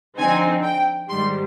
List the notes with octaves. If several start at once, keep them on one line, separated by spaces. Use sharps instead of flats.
D3 F3 C4 D#4 G#5
G5
G#2 D#3 G3 C6